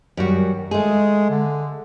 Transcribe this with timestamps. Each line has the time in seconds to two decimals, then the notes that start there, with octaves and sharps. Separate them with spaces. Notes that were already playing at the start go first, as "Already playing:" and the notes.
0.17 F#2 D#3 G3 F#4
0.71 G#3 A3 G#4
1.30 D3